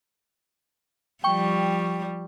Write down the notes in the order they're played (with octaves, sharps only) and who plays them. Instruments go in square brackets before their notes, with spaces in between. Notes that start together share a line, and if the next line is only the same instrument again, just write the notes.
[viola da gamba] F3 G3 [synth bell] G5 C#6